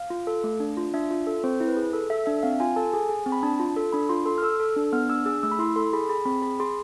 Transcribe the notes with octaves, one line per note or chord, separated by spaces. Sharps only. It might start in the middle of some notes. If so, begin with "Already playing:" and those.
Already playing: F5
F4
A4
A3
D4
F4
D4 E5
F4
A4
C4 C5
E4
B4
G#4
A4
A4 E5
D4 E5
C4 F5
F4 G#5
A4 A5
G#4 G#5
G#4
C4
B5
D4 A5
F4
A4
D4 B5
F4 C6
A4 C6
F6
A4 E6
A4
D4
B3 F6
D4 E6
G#4 E6
A3 E6
B5
E4 C6
A4 C6
G#4 B5
G#4 B5
C4 B5
G#4 B5
G#4 C6